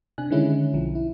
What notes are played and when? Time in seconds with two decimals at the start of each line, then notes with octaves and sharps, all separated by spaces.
0.18 C3 D4 G#5 F#6
0.30 D3 D#3 G3 G#3 C#4 E4
0.74 B1 F3
0.95 E4